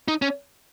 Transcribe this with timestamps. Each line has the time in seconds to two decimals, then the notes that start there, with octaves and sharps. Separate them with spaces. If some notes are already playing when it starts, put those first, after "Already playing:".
0.08 D#4
0.22 C#4